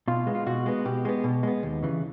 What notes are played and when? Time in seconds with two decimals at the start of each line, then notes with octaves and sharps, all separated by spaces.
0.08 B2 F4
0.27 G#3 B3
0.35 F4
0.46 B2 F#4
0.66 G#3 B3
0.85 B2 G4
1.05 G#3 B3
1.24 B2
1.43 G#3 B3
1.63 D#2
1.83 C#3 E3